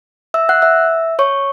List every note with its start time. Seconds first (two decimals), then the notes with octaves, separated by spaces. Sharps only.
0.34 E5 E6
0.49 F#5 F#6
0.62 E5 E6
1.19 C#5 C#6